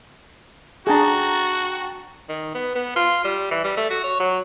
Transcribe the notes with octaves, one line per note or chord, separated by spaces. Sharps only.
D4 F#4 G#4 G5 A5 A#5
D#3
B3
B3
F4
G3
E3
G3
A3
F#4
C#5
F#3